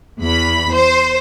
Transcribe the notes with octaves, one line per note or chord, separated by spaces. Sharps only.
E2 B5
C5